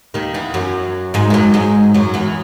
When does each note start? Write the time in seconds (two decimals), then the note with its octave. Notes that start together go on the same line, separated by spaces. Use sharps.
0.14 D#2 D#3
0.34 E2 E3
0.54 F#2 F#3
1.14 G#2 G#3
1.30 E3
1.34 F#2 F#3
1.54 G#2 G#3
1.94 F#2 F#3
2.14 E2 E3